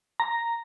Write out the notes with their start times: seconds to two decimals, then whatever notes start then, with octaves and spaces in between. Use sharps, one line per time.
0.20 A#5